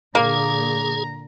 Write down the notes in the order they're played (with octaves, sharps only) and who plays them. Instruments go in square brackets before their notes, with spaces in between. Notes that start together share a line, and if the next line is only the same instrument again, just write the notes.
[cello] A#2 D3 [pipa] A#3 [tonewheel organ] G#4 [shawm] A#5